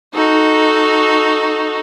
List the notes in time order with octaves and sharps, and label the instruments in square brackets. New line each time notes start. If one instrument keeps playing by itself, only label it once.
[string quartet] D#4 F#4 A4